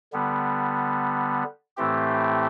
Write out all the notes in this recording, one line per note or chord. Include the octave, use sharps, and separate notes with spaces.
D3 G3 B3
A2 E3 A3 C4 G4